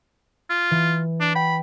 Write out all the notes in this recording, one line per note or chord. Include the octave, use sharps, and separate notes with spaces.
F4
E3
D4
G5 B5